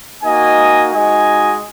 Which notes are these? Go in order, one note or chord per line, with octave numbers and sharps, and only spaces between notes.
A#3 D#4 F#4 D#5 G#5
G#3 D#4 F#4 D#5 G#5